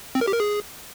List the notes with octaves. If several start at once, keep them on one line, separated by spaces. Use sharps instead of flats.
C4
A#4
G4
A#4
G#4